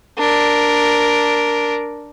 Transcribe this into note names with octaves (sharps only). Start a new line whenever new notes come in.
D4 A#4